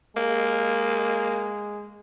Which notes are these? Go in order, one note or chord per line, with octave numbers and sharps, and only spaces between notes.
G#3 A#3